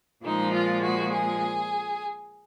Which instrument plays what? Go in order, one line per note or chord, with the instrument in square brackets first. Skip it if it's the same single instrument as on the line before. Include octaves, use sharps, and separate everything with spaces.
[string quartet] A#2 F3 G#3 D#4
F4
F#4
G#4